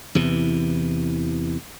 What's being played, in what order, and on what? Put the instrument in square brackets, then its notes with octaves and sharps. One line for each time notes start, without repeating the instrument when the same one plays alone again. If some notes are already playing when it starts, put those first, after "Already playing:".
[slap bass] E2 C3 E3